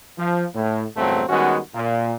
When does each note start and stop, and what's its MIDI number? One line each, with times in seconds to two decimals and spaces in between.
0.18 0.44 53
0.54 0.83 45
0.96 1.22 40
0.96 1.22 43
0.96 1.22 46
0.96 1.22 54
0.96 1.22 57
0.96 1.22 60
1.29 1.58 51
1.29 1.58 55
1.29 1.58 56
1.29 1.58 59
1.29 1.58 61
1.29 1.58 66
1.74 2.13 46